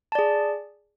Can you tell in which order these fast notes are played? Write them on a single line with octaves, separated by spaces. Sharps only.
A5 D5 G#4